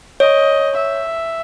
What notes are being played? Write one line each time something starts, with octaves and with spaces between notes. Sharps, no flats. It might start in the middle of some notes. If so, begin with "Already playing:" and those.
C#5 D#5
E5